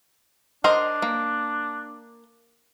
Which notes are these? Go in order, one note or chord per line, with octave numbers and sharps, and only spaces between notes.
D4 A#4 C5 D#5
A#3